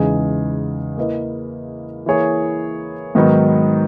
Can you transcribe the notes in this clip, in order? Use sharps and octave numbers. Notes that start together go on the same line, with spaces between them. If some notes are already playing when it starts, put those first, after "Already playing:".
Already playing: E2 C#3 G#3 D#4 G#4
A#3 E4 B4 D#5
E3 A#3 E4 G#4 C#5
G#2 D#3 F#3 B3 D#4